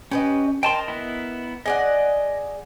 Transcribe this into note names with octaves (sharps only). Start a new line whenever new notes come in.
C#4 G4 B4 D#5
A#4 D#5 G5 A5 C6
B3 E4
G#4 D5 D#5 F#5